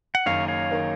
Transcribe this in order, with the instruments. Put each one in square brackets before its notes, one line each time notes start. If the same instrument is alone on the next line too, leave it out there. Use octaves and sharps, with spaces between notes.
[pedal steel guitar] F#5
[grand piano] F#1 F#2 D#3 A#3 [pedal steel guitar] C#5 F5
[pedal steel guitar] C#5 F5
[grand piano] D#3 A#3